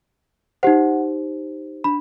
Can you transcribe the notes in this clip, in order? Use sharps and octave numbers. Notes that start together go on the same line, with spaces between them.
D#4 G4 C5 F#5
D4 B5